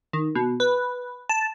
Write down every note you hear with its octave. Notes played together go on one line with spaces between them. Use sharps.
D#3
B2
B4
A5